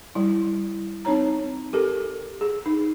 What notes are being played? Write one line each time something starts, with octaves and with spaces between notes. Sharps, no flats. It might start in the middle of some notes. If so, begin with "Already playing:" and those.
G3 E4
C4 D#4 C#5 A#5
G4 A4 A#4
G#4
D#4